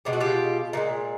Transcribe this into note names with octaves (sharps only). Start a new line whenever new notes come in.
B2 G#3 G4
F#4
F4 G4
A#2 F3 G#3